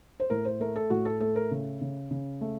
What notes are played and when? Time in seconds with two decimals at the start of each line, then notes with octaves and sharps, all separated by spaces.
0.20 C5
0.30 A2 A#4
0.45 C5
0.60 A3 A#4
0.76 A4
0.90 A2 F#4
1.05 A4
1.20 A3 A4
1.36 A#4
1.51 C#3
1.81 C#3
2.11 C#3
2.41 A3